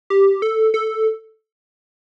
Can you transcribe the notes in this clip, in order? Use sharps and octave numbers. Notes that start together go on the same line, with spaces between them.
G4
A4
A4